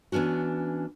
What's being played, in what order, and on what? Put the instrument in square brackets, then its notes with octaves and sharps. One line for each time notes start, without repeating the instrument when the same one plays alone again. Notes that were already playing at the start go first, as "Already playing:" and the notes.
[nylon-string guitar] E3 B3 C#4 D4 F#4